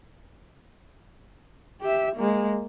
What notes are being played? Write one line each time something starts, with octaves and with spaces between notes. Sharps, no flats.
G4 E5
G#3 A#3